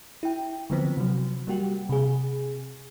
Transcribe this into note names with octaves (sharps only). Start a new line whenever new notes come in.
E4 G5
D3 E3 F3 B3 C4
C3 F#3
G3 A#3 F#4 G4
C3 G#4